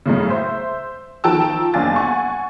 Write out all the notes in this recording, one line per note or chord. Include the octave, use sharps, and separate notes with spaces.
F#2 A2 C#3
C5 E5
D#3 F3 G5 A5 A#5 E6
F#1 C#4 D4 F5 G#5 A6
F#5 G#5 C#6